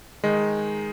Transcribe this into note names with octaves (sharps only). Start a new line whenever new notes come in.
D#3 G#3 D#4